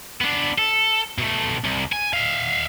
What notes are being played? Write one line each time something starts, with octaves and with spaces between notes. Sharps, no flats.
B3 D4
A4
B2 A3
C2
G#5
E5 F5